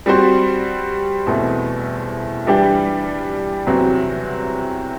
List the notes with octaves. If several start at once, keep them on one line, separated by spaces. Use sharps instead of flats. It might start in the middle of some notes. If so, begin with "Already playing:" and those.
G3 C4 F#4 C5
E2 B2 A3 C4
E3 G3 D4 G4
E2 C3 F#3 C4 F#4